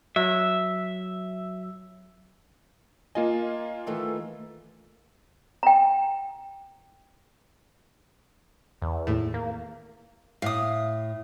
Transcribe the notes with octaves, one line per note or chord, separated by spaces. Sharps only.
F#3 E5
A#3 F4 D#5 G#5
D#3 E3 A3
G5 A#5
E2
D#2 A2
A#3
A2 F5 D#6